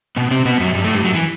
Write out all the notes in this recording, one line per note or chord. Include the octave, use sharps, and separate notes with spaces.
B2 B3
C3 C4
B2 B3
F#2 F#3
G2 G3
A2 A3
G2 G3
F#2 F#3
E3